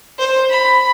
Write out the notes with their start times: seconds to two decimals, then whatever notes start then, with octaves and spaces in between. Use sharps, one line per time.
0.19 C5
0.50 B5